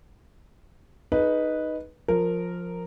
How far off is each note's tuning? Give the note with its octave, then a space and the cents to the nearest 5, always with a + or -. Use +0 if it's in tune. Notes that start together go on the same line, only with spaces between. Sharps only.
D#4 +0 G#4 +35 B4 -10
F3 +15 A#4 -10